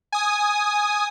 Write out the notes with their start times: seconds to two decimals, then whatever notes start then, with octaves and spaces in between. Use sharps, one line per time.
0.12 G#5 D#6